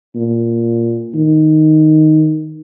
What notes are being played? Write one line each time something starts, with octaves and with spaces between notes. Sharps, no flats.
A#2
D#3